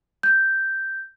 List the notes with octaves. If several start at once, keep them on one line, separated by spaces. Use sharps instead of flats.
G6